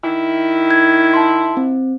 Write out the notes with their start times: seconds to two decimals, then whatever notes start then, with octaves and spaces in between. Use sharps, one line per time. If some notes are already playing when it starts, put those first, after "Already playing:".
0.04 D#3 E4
0.71 G#6
1.14 A5 C6
1.57 C4